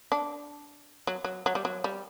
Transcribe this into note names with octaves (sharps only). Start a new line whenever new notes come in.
D4
F#3
F#3
F#3
G3
F#3
G3